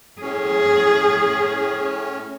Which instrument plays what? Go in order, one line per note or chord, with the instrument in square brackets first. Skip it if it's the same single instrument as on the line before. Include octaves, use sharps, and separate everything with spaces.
[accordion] A2 C#4 [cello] G#4